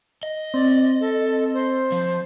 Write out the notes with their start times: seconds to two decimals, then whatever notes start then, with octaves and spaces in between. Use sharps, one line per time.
0.23 D#5
0.54 C4 D5
1.01 A4
1.54 C5
1.92 F3